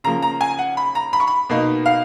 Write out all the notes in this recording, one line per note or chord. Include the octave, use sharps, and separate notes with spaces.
C#3 F3 A#3 A#5
A#5
G#5
F#5
B5
A#5
B5
C#6
B5
B2 A#3 D#4
F5